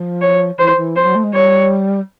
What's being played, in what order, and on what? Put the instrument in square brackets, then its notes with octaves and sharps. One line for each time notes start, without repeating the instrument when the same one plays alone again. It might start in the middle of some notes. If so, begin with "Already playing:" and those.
Already playing: [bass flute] F3
[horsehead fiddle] C#5
[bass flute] E3 [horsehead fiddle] C5
[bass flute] E3
[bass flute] F3 [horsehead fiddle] C5
[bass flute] F#3
A3
G#3
[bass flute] G3 [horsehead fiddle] C#5